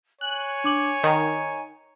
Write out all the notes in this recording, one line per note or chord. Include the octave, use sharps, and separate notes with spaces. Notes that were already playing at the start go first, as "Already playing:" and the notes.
C#5 G#5 F#6
D4 D6 F#7
D#3 D#5 A#5